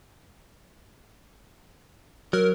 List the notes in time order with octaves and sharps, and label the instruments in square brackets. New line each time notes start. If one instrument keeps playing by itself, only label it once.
[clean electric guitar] F#3 [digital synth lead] A#4